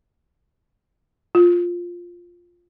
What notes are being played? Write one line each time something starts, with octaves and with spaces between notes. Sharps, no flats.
F4